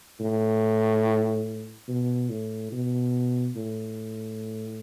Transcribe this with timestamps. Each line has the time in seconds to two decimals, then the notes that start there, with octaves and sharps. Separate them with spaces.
0.20 A2
1.88 B2
2.30 A2
2.72 B2
3.56 A2